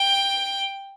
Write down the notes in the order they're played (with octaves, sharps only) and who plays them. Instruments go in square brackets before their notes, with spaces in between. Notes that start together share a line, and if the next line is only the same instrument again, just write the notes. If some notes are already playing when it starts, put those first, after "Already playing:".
Already playing: [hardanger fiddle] G5